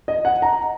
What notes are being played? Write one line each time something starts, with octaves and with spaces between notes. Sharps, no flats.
D#5
F#5
A#5